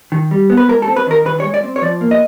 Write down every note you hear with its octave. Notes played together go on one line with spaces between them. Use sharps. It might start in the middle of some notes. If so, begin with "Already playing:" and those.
D#3
G3
B3
B4
G#3 A#4
A4
C4
B4
D#3 A#4
D#3 B4
C#5
G#3
D5
C4
C#5
F3 D5
A#3
D#5